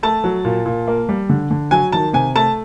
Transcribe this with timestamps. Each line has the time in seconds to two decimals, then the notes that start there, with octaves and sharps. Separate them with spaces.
0.03 A3 A5
0.24 F#3
0.45 A#2
0.66 A#2
0.87 A#3
1.09 G3
1.29 D3
1.51 D3
1.71 F#3 G#5
1.92 D#3 A5
2.13 C3 G#5
2.35 A3 A5